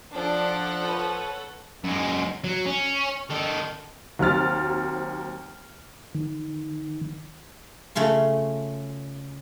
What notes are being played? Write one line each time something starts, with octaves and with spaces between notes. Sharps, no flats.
F3 D4 A4 F#5
B4 C#5
F#2 G#3
F#3
C#4
D#3 A4
D#2 F#3 C4 F6 A6
D#3
C#3 A3 C#4 F4